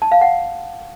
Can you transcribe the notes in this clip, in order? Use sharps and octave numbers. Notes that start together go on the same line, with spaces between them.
A5
F5
F#5